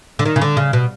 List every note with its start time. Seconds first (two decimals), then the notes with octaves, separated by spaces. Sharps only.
0.19 D3
0.26 D#3
0.36 C#3
0.41 D3
0.57 C#3
0.73 B2